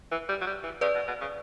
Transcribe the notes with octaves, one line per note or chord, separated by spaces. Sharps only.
E3
G3
F#3
G3
E3
C#3 B4 D5
B2
B2
C#3